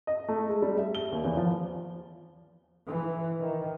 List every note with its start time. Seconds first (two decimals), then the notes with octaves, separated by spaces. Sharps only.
0.07 D#5
0.28 A3
0.49 G#3
0.62 G3
0.77 E5
0.95 G7
1.12 D#2
1.25 E2
1.37 F3
2.88 E3
3.40 D#3